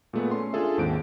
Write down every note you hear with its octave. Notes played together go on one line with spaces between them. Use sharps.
A#2 G#3 A3 B3
C#4 C6
D4 F4 G#4 A4 E5
D#2 G#2 C4 G#4 D7